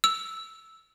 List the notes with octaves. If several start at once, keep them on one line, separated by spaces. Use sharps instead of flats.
E6